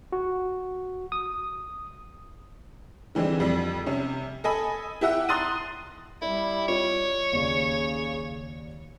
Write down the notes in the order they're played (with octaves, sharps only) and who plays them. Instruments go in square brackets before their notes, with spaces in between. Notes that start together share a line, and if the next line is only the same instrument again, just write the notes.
[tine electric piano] F#4
D#6
[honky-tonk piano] D3 E3 G3 G#3 C4
F2 G3
C3 C#4
A4 D#5 G#5 B5
E4 G4 E5 F#5
A#5 C6 D#6 F#6 A6 D#7
[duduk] G3 [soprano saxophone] E4 [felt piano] D5
[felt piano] F4 D#5 [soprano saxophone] C#5
[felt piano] D#2 D5 [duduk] C#3